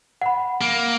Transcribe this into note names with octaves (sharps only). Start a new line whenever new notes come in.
F#5 B5
A#3